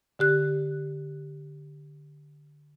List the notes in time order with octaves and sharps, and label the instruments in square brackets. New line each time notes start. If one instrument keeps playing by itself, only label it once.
[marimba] D3 G4 F#6